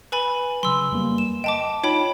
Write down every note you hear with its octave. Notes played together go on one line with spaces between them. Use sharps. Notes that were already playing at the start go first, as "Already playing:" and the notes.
B4 G#5 B5
C#3 F#3 C6 E6
F2 G3 A#3
E7
D#5 G5 A5 D6
D#4 F4 C#5 G5 B5